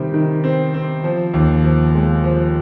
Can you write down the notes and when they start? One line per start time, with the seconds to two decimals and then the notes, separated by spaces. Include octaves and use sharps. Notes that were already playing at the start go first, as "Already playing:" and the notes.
Already playing: C3 D#3 G3
0.14 D#3
0.44 C4
0.74 C4
1.04 F3
1.34 D#2
1.64 F3
1.94 G#3
2.24 F3